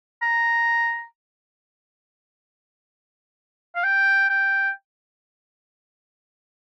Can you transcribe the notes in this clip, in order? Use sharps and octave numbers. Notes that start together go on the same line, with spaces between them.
A#5
F5
G5
G5